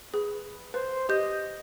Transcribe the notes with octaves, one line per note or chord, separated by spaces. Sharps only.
G#4 B4
B4 C5
G4 D#5 G6